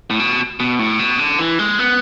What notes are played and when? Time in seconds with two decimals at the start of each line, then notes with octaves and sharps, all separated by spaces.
0.10 A2
0.19 B2
0.60 B2
0.79 A2
0.99 B2
1.19 D3
1.39 E3
1.59 G#3
1.79 B3